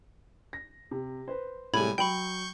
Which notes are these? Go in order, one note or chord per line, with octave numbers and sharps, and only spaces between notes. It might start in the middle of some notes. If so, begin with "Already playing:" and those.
A#6
C3
B4 C5
A2 C3 G3 G#3 G#5 B5 G#6
F#3 G5 B5 C#6 G6